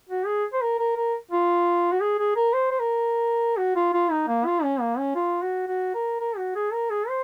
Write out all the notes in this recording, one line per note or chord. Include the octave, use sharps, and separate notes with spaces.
F#4
G#4
C5
A#4
A#4
A#4
F4
F#4
G#4
G#4
A#4
C5
C5
A#4
F#4
F4
F4
D#4
A#3
F4
C#4
A#3
C#4
F4
F#4
F#4
A#4
A#4
F#4
G#4
A#4
G#4
C5